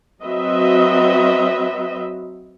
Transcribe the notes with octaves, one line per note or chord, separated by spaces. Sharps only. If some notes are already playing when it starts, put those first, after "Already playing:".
F#3 C4 F#4 B4 D#5 E5